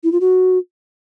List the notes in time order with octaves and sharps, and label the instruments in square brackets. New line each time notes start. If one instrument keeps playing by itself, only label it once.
[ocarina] E4
F4
F#4